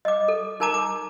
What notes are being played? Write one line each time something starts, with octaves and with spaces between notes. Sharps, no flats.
D#5 D6
A4
D#4 A#4 A5 A#5 D6
D6